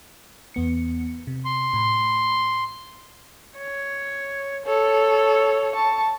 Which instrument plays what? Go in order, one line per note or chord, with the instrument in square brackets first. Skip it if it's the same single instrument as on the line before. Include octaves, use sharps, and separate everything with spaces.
[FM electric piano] E2 B3 C#7
C3
[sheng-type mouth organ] C6
[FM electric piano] A2 B5
[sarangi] C#5
[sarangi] A4 [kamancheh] C#5
[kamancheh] A5 C#6